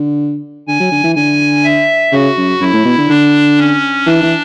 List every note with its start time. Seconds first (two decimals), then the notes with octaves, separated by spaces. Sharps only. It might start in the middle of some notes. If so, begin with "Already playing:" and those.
Already playing: D3
0.68 D3 G#5
0.80 F#3
0.91 D3
1.04 E3
1.15 D3 G#5
1.64 E5
2.12 C#3 F#4
2.37 F#2
2.60 F#2 E4
2.73 A2
2.85 B2
2.98 D3
3.09 D3 D4
3.58 C#4
4.06 E3 D4
4.22 E3